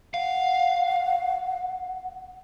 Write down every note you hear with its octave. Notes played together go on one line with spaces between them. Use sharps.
F5 F#5